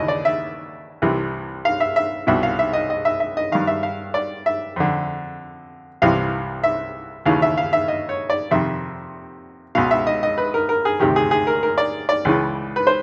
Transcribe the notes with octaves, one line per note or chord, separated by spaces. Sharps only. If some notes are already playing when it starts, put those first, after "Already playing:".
Already playing: D#2 C#3 E3 D#5
D5
E5
C2 C3 E3
F5
E5
E5
C2 B2 E5
F5
E5
D#5
D#5
E5
E5
D#5
G2 D#3 F5
E5
F5
D5
E5
F2 D3
C2 C3 E3 F5
E5
D#2 C#3 E3 F5
E5
F5
E5
D#5
C#5
D5
F2 C3 D#3 E5
C#2 B2 F5
E5
D#5
D#5
B4
A#4
A#4
G#4
D2 C3 D#3 G4
G#4
G#4
A#4
A#4
D5
D5
C#2 C#3 E3
B4
C5